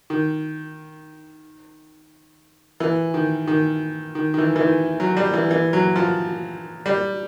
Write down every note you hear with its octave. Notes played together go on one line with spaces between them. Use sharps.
D#3
E3
D#3
D#3
D#3
D#3
E3
E3
D#3
F#3
G3
E3
E3
F#3
F3
G3